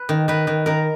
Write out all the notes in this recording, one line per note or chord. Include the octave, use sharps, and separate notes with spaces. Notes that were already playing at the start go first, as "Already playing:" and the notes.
Already playing: B4
D#3
D#3 B4
D#3
D#3 A#4